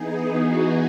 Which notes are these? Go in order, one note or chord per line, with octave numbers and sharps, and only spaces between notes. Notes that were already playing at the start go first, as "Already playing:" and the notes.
Already playing: E3 B3 D#4 G#4
F#4